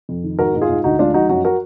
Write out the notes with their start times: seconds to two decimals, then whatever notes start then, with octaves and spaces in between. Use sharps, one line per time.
0.09 F2
0.24 D#3
0.39 G#2 F#4 A#4
0.54 G#2
0.62 F4 G#4
0.69 G#2
0.84 D2 D#4 F#4
0.99 G#3 D4 F4
1.14 F3 D#4 F#4
1.29 F#2 D#4 F#4
1.45 F#4 A#4